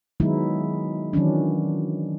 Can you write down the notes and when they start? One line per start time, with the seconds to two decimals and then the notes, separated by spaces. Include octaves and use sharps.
0.20 D#3 F#3 G#3 B3 D#4 E4
1.13 D#3 E3 F#3 C#4 D4